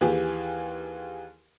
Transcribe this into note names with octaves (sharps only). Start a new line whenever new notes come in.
D#2 E3 G4 G#4